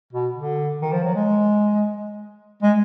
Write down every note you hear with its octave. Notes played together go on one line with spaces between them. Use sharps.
B2
D3
D#3
F3
F#3
G#3
G#3